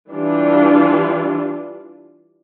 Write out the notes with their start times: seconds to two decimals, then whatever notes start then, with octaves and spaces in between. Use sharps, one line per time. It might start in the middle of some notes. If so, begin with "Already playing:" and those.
0.10 E3 G3 D4 F4